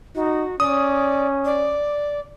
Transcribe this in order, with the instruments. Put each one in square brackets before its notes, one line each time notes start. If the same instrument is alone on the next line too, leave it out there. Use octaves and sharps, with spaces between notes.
[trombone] D#4 [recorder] F#4
[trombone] C#4 [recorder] D5 [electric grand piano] D#6
[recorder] D5